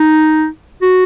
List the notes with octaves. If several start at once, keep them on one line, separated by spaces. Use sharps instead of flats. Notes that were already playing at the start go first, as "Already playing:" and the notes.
Already playing: D#4
F#4